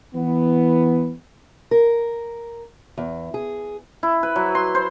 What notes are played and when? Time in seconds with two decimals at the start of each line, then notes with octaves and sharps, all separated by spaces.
0.14 E3 B3
1.71 A#4
2.98 E2
3.34 G#4
4.03 E4
4.23 B4
4.36 F#3
4.55 C6
4.75 C5